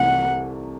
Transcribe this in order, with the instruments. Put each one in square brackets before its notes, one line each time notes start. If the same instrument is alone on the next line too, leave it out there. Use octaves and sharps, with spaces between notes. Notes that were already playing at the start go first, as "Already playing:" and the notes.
Already playing: [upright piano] C2 C3 E3 A3 [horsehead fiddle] F#5